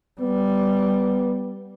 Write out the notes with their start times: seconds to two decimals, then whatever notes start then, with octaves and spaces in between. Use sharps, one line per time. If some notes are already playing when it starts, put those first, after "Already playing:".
0.20 G3 B3